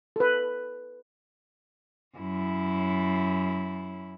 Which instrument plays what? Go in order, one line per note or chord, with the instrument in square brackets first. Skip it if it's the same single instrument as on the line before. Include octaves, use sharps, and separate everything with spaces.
[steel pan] A4 B4
[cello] F#2 E4